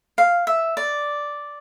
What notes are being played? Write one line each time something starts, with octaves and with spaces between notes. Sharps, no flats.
F5
E5
D5